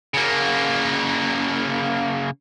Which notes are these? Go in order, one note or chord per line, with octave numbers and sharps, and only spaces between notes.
C#3 A#3